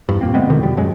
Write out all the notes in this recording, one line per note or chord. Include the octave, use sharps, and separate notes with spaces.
E2 G2
A#2 A#3 C4
D2 G#3 B3 C4
E2 B2 D3 D#3
F2 B2 G3
F#2 F#3 G#3